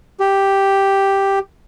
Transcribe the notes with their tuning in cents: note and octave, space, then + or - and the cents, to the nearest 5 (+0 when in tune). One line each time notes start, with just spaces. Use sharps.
G4 +0